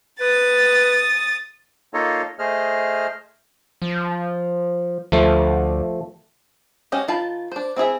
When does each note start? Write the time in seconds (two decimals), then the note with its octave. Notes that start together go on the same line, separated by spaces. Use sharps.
0.21 B4 D#6 A6
1.94 A#3 D#4 F4 A4 C#5 D#5
2.39 A3 G#4 C5 D#5 F6
3.82 F3
5.12 D2 F3 A3
6.92 G#3 C#4 F#4 G4 D#5
7.08 D#3 F4 A5 B5
7.52 D4 C5
7.76 C4 E4 G#4 E5